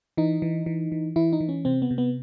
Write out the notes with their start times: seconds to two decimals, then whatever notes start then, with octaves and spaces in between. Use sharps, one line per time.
0.17 E3 D#4
0.42 E3
0.66 E3
0.92 E3
1.16 E3 E4
1.33 D#4
1.40 E3
1.49 C#4
1.65 C3 C4
1.82 B3
1.91 C3
1.98 B3